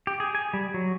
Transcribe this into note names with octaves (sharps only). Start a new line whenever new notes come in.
G4
G#4
G#5
G3
F#3